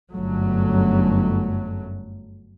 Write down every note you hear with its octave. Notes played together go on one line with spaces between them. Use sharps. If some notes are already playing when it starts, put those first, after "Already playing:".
G1 F#2 F#3 A3